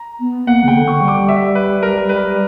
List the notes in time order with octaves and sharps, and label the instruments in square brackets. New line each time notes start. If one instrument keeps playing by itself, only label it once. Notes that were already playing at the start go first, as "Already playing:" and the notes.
Already playing: [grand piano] A#5
[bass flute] B3
[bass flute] A#3 [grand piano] F#5
[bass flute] C#3 [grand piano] G5
[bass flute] D3
[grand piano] C#6
[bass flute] G3
[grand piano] D6
E5
B4
A#4
B4